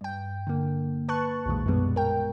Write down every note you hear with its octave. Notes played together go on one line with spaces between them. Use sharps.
G2 G5
D3 A#3
B4 A5 C#6 F#6
B1 F2 A#2 D#3 G#3
F#2 B2 D#3 G3 G#3 B3
A#4 G5